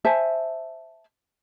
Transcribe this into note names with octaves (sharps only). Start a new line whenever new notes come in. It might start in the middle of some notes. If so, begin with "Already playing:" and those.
C5 E5 G#5 A5